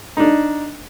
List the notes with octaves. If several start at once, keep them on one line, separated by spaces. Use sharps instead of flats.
D4 D#4